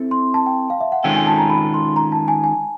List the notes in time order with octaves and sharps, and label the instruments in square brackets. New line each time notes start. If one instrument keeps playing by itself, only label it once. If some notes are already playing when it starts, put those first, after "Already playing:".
Already playing: [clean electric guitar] C4 E4 A4
[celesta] C6
A5
G5
F5
E5
F#5
[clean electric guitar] D#3 G#3 C#4 F4 A4 [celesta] G5
[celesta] G#5
A5
A#5
B5
C6
A#5
A5
G#5
G#5